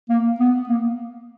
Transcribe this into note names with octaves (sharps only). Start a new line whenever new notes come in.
A#3
B3
A#3